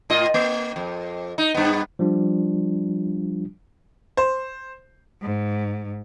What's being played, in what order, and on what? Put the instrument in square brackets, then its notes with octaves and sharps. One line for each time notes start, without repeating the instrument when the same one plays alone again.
[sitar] A2 F4 D#5
A#3
F2
D#4
G2 B3
[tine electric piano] F3 G3 D4 F4
[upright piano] C5
[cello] G#2